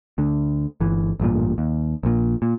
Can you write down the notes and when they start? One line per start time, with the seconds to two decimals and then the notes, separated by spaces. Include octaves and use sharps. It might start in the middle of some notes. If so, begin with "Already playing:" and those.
0.18 D2 D3
0.80 G1 E3
1.20 A1 G2 A#2
1.58 D#2
2.03 A#1 A#2
2.42 A#2